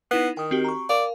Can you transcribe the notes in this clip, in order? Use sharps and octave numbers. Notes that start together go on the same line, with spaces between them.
B3 D#4 E4 C7
D#3 G5 D#6
C4 F#4 G4
A#5 C#6
A#4 D5 F5